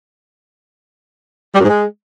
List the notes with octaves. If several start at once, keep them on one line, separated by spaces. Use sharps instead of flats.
G3
F#2
G#2
G#3